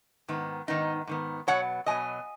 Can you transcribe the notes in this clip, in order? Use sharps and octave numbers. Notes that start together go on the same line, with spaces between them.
G#2 D#3 B3
G#2 D#3 B3 D#4
G#2 D#3 B3
B2 F#3 B3 C#5 F#5
B2 F#3 B3 D#5 G#5